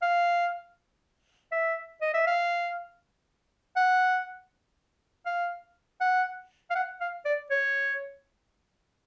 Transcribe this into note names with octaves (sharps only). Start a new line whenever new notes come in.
F5
E5
D#5
E5
F5
F#5
F5
F#5
F5
F#5
F5
D5
C#5